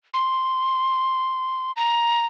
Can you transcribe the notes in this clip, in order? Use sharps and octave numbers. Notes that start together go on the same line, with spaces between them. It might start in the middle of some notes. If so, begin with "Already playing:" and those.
C6
A#5